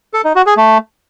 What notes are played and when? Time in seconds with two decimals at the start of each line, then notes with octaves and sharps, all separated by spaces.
0.14 A4
0.25 D#4
0.35 F#4
0.46 G#4
0.57 A3